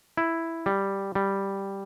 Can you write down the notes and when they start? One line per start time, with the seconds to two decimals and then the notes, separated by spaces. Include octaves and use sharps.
0.17 E4
0.66 G3
1.15 G3